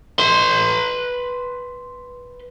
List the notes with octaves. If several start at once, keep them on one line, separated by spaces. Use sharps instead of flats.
B4 C6